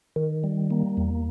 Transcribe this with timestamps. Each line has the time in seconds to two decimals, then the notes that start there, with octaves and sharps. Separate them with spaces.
0.16 D#3
0.44 G3
0.71 A#3
0.97 E2